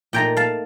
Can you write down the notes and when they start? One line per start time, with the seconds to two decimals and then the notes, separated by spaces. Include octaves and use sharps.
0.13 A#2 A3 D#4 G5 A#5
0.37 F5 A5